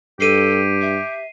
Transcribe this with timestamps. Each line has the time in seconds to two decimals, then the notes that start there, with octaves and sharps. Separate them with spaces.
0.20 G2 G4 A4 C7 D#7
0.82 E5